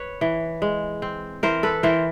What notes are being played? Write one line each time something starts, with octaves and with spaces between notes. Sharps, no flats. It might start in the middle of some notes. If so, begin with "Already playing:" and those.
Already playing: B4 C#5
E3
G#3
C4
E3 A#4 C5
A4 B4
E3 A#4 C5